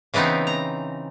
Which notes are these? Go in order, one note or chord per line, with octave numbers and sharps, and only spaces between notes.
C#3 E3 B3 C4 D#4
A#5